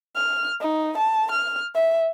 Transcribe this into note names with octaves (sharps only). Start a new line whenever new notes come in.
F6
D#4
A5
F6
E5